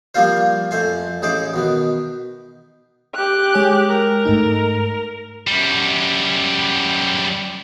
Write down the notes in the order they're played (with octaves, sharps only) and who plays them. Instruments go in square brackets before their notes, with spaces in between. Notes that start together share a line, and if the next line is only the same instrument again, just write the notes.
[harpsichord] F3 G3 A#3 C4 F4 C5
F2 A3 C5 G#5
A1 D#4 G#4 C5 D6
B2 D#3 B3
[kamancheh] G4 F#6
[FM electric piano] G#3 C#5 G#5
[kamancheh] A#4
[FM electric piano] G#2 A3 D#4
[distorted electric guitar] F#2 G3